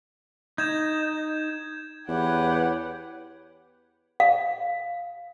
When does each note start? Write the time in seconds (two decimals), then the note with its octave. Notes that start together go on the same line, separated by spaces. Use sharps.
0.58 D#4 G6 G#6 E7
2.08 E2 G4 B4 C#5 F#5
4.20 F5